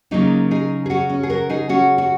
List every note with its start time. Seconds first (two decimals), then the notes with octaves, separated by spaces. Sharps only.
0.11 C#3 F#3 A#3 D#4
0.51 D#4 G#4
0.86 G#4
0.90 C#4 F#4
1.10 C#4
1.23 G#4
1.30 F#4 A#4
1.50 D#4 G#4
1.69 C#4 F#4
1.98 F#4